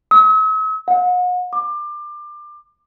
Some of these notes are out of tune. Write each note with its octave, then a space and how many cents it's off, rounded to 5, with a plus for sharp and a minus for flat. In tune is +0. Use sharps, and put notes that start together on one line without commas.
E6 -45
F#5 -40
D6 +25